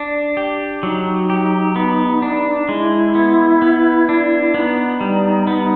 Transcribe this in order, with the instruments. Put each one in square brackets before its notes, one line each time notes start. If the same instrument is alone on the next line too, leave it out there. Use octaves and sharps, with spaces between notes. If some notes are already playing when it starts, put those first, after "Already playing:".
Already playing: [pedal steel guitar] D4
G4
[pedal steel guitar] F#3 [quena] D#4
[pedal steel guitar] G4
B3
D4
[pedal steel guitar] G#3 [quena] E4
[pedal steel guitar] B3
B3
D4
[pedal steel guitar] B3 [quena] D#4
[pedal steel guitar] G3
B3